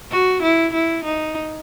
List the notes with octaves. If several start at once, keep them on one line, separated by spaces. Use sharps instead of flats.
F#4
E4
E4
D#4